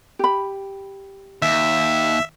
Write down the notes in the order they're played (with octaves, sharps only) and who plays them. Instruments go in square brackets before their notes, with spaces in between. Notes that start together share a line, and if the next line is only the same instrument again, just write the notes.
[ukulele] G4 B5
[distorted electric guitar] D#2 [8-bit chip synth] E5